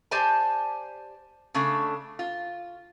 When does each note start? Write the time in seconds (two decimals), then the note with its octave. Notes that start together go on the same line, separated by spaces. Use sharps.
0.11 G4 C5 D5 G#5 A5
1.54 C#3 A3 D4
2.19 F4